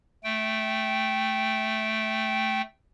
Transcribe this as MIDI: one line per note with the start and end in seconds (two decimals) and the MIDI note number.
0.24 2.62 57
0.24 2.62 79